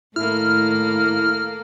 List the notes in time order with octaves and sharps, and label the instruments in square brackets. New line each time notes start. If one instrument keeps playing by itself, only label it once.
[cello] A2 D#3 [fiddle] A#3 A4 [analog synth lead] E4 [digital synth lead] F6